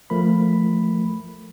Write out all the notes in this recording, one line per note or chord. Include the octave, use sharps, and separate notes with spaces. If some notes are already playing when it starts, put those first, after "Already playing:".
F3 A3 A#4 B5